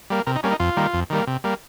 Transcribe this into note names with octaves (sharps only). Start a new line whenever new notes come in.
G3 A#3
C3 A#4
D#4
G3 A#3 C#4
D#4
F2 F4
D#3 G3 A#3
F2
D#3 G3 A#3
C3
G3 A#3